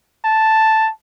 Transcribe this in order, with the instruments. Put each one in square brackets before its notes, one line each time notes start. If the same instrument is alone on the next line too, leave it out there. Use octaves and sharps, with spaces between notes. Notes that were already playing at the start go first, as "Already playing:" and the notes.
[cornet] A5